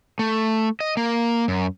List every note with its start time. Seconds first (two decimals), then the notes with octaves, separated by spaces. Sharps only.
0.19 A3
0.80 D#5
0.97 A#3
1.48 F#2